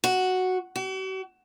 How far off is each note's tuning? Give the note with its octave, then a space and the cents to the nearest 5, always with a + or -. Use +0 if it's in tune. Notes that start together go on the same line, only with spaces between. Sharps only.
F#4 +0
F#4 +45